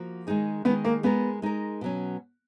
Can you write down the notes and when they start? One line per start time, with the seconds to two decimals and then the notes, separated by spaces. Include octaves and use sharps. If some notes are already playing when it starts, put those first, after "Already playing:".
Already playing: F3 A#3 F#4
0.27 D#3 G#3 D#4 G#4
0.65 D#3 G#3 B3 D#4 G#4
0.85 A#3
1.03 G#3 B3 D#4 A#4
1.42 G#3 D#4 A#4
1.81 B2 F#3 C#4